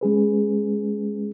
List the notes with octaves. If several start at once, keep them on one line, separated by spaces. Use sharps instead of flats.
G#3 C#4 G#4 B4